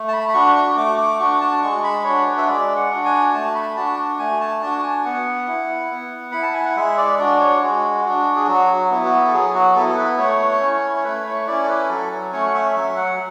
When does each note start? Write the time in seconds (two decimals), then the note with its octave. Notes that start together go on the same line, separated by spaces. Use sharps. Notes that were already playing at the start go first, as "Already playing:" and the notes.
Already playing: A3
0.08 A5
0.13 B5
0.29 B5
0.34 D4 F#4 C#6
0.55 C#6
0.77 A3 D6
0.98 D6
1.19 D4 F#4 C#6
1.41 A5
1.62 G#3 C#6
1.84 B5
2.05 D4 F#4 C#5
2.27 B4
2.38 E5
2.48 G#3 D5
2.76 F#5
2.91 D4 F#4
3.05 G#5
3.34 A3 A5
3.55 B5
3.76 D4 F#4 A5
4.19 A3 G#5
4.41 A5
4.62 D4 F#4 A5
4.83 G#5
5.05 B3 F#5
5.48 E4
5.90 B3
6.32 E4 B5
6.43 A5
6.54 G#5
6.65 F#5
6.76 G#3 E5
6.98 D5
7.19 D4 F#4 D5
7.40 C#5
7.62 G#3 F#4
8.05 D4 F#4
8.36 G#4
8.47 F#3 F#4
8.91 B3 E4
9.05 F#4
9.27 A4
9.33 F#3 G#4
9.55 F#4
9.76 B3 E4 A4
9.89 A4
9.97 B4
10.18 A3 C#5
10.61 C#4 E4
10.96 C#5
11.04 A3 B4
11.26 C#5
11.47 C#4 E4 D5
11.63 A4
11.69 B4
11.89 F#3 A4
12.32 A3 C#4 C#5
12.46 F#5
12.54 E5
12.76 F#3 E5
12.97 F#5